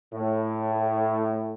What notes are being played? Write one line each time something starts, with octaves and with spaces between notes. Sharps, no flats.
A2